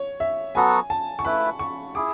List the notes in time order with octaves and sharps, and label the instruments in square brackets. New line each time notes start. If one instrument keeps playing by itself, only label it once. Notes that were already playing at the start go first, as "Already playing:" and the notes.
Already playing: [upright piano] C#5
E5
[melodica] F#3 B3 F#4 A4 [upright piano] G#5
[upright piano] A5
C#6
[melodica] A3 E4 B4 [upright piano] B5
[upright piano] C#6
[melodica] E4 G#4 [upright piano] D6